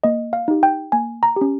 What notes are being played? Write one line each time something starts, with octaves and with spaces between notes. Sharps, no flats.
A#3 D#5
F5
D#4 G4
G5
A#3 G#5
A#5
C#4 G4